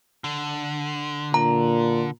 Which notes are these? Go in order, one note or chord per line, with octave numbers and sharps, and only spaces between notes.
D3
A#2 A#5